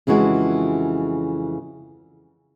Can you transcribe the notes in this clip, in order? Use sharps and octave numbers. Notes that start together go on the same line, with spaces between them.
F2 C#3 E3 G#3 F#4